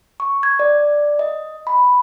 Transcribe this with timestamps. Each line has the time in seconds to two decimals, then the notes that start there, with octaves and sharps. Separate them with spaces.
0.20 C#6
0.43 G#6
0.59 D5
1.19 D#5
1.67 B5